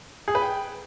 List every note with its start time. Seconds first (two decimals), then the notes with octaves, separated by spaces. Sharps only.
0.28 G#4
0.35 B4
0.42 G5